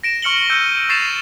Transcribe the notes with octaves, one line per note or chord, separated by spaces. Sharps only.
A#6 D7 E7
C#6 F6 C#7 F#7 G7
E6 G6 C#7 D#7
C#6 A6 C7 E7 F7